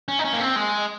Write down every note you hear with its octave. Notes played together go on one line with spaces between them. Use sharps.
C#4
D#4
C#4
A#3
C4
G#3